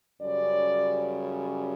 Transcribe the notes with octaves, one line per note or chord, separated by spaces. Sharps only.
F#2 C#3 G3 C#4 D5